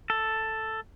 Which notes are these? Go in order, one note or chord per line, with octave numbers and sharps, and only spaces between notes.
A4